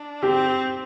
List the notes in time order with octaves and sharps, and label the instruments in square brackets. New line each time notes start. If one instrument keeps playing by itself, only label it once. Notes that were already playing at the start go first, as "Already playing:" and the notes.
Already playing: [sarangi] D4
[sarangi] C4 [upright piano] G4